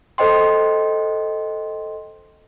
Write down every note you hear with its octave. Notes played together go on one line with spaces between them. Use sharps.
A4 C5 D#5 G5 C6